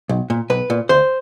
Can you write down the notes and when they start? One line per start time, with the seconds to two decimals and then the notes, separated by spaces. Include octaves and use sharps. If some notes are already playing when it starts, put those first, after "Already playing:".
0.09 B1
0.30 A#2
0.50 B1 B4
0.70 A#2
0.89 D2 C5